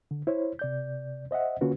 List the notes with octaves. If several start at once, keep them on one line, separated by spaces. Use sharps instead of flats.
D3
E4 C5 C#5
C3 D5 G6
C5 D#5 E5 F#5
D3 A#3 C#4 F4 F#4 B4